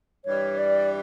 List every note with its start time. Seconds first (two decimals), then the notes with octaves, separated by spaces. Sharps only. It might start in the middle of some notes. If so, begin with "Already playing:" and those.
0.25 G2 E3 G3 C#5
0.58 D5